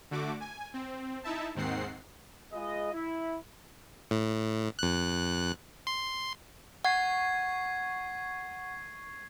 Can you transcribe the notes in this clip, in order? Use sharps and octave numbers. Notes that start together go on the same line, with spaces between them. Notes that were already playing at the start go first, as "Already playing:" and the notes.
D3 A3 F#4 D6
G#5
C4
D#4 E4 E5 A5
D#2 G#2 D#3 C4 F#5 C7
G#3 F4 G#4 B4 D#5
E4
A2
F2 F#6
C6
F#5 C#6 G#6 C7